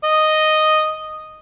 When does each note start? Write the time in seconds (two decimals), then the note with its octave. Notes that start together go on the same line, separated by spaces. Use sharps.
0.04 D#5